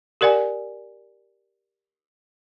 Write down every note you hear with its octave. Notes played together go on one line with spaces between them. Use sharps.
G4 A#4 D5 F#5 G#5